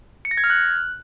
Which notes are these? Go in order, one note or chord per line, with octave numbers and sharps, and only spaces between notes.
C#7
A#6
G#6
F6
F#6